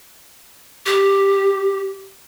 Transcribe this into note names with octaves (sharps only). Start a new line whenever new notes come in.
G4